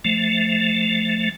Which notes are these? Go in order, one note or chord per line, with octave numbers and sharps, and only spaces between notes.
F3 A3